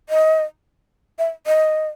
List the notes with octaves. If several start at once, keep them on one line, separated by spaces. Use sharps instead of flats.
D#5
E5
D#5